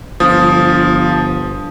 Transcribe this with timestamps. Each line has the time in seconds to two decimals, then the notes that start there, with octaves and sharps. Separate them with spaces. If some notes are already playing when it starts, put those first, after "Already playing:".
0.20 G1 F3 D#6